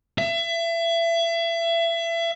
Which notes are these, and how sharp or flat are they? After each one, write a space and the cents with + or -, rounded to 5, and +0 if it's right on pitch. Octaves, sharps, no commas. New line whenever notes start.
E5 +30